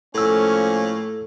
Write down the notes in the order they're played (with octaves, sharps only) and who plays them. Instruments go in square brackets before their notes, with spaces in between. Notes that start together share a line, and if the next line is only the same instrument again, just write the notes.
[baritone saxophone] A2 [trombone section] F3 A#3 C#4 [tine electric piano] A4 E6